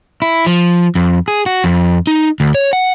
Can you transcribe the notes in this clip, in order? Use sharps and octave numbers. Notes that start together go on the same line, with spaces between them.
E4
F3
F2
G#4
F#4
F2
D#4
D2
C#5
F#5